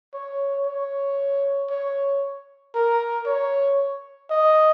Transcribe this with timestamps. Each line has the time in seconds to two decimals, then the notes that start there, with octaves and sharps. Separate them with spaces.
0.14 C#5
0.66 C#5
1.70 C#5
2.75 A#4
3.26 C#5
4.31 D#5